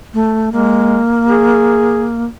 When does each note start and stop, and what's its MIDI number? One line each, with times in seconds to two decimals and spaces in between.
0.14 0.50 57
0.52 1.00 56
0.52 2.24 58
1.28 2.06 68